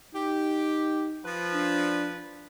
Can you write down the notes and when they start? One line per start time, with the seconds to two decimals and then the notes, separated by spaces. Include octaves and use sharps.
0.15 D#4 G4
1.25 F3 B4
1.54 D4